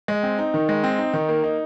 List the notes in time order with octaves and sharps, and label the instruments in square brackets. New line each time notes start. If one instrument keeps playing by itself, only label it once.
[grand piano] G#3
C4
D#4
D#3
G#3
C4
D#4
D#3
A#3
D#4